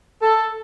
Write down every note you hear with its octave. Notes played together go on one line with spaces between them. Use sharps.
A4